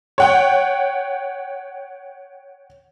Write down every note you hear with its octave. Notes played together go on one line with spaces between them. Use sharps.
C#5 F#5 G5